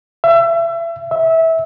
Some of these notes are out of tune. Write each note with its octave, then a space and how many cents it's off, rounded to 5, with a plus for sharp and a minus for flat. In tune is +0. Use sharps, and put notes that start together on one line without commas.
E5 +30
E5 -20